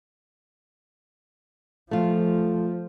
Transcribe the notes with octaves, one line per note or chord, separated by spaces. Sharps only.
F3 A3 F4